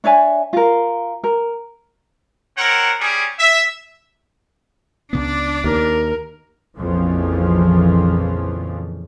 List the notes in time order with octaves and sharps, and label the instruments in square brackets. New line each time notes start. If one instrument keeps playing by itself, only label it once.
[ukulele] D4 C#5 E5 G#5
F4 A#4
A#4
[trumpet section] C4 A#4 C#5 F#5
G3 C#4 G#4
E5
[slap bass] C#2 C#3 B3 [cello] D4 D5
[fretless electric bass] D#2 [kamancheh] A#4
[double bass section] A#1 F2 C#3 E3 F3